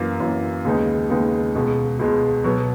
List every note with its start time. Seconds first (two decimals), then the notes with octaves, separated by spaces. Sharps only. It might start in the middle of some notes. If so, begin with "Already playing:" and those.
Already playing: F#2 E3 A#3
0.20 F#2 E3 A#3
0.65 D#2 C#3 G#3 B3 D#4
1.10 D#2 C#3 G#3 B3 D#4
1.55 C#2 B2 G#3
1.99 C#2 B2 G#3
2.44 B2 F#3 B3